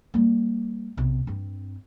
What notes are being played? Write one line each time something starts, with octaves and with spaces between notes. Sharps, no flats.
G3 A#3
B1 C3
G2 C4